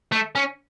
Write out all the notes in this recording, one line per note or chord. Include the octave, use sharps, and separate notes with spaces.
A3
C#4